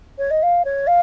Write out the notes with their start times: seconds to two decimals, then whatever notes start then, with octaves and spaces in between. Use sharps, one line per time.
0.18 C#5
0.30 D#5
0.42 F5
0.65 C#5
0.87 F5